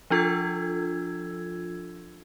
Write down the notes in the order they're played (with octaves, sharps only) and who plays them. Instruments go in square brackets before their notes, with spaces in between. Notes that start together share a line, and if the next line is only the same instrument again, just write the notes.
[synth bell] F3 D4 F4 A4 E6 G#6